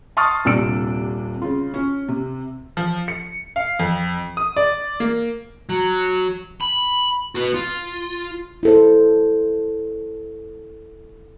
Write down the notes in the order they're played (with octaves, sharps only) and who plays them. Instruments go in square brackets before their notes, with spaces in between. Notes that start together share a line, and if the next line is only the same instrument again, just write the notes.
[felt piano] A5 C6 C#6 D#6 F6 A6
D#1 C3 D4 E6 D7
C#3 F4
C#4
C3
[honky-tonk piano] F3
C#7
F5
F2
D#6
D5
A#3
[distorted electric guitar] F#3
B5
F#4 B4
F4
[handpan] E4 A4 C5